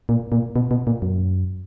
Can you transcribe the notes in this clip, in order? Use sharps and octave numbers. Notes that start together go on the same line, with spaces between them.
A#2
A#2
B2
B2
A#2
F#2